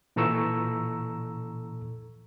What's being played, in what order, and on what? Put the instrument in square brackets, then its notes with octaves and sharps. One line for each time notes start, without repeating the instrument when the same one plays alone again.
[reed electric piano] A#2 E3 A4 A#5 C#6 E6